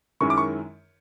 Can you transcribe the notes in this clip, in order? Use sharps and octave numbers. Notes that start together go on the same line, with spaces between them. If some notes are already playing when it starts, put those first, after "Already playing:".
F#2 D#3 G#3 C#4 E4 C#6
D6
C#6